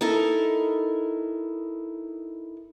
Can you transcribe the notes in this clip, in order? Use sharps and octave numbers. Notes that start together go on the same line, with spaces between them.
D#4 E4 A4 A#4